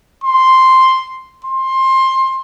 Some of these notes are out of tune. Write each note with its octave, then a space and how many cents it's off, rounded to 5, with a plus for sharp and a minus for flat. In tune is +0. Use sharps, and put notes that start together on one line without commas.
C6 +0
C6 +20